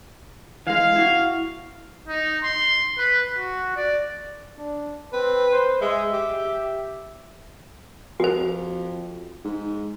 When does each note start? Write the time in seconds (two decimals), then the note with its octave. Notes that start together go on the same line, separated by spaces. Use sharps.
0.67 E3 G#3 F5
0.96 E4 F#4
2.08 D#4
2.44 C6
2.99 B4
3.35 F#4
3.76 D5
4.58 D4
5.13 C4 B4
5.51 C5
5.81 G#3 E5
6.12 G4
8.20 F2 F#4 C5
9.45 G#2